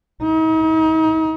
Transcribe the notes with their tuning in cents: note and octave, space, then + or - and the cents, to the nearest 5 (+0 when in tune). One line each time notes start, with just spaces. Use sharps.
D#4 +40